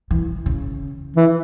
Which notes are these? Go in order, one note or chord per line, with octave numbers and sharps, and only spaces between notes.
E3
C#3
E3